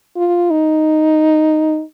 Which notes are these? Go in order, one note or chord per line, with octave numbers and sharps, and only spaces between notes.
F4
D#4